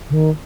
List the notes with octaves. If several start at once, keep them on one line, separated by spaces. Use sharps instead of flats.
C#3
D#3